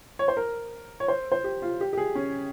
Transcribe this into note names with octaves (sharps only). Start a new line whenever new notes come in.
C#5
C5
A#4
C#5
C5
C5
G4
F4
G4
G4
G#4
C#4